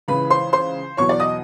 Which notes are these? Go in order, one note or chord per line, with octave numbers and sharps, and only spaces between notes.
C#2 C#3 E3 B4 B5
C5 C6
C5 C6
E2 B2 F#3 C#5 C#6
D5 D6
D#5 D#6